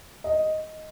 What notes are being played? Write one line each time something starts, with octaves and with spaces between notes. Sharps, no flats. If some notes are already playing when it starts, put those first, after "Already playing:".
D#5